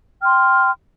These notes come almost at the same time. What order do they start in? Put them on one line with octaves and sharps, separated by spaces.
G5 F6 C6